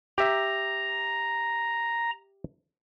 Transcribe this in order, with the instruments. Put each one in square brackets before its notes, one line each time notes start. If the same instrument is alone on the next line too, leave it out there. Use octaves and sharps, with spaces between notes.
[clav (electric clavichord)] G4 E5 [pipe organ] A#5